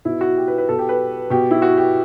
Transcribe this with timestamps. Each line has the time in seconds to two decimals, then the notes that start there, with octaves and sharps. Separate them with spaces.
0.05 B2 E4
0.21 F#4
0.37 G4
0.48 B4
0.58 B4
0.69 B2 A4
0.79 G4
0.89 B4
1.30 B2 G4
1.51 E4
1.62 F#4
1.77 G4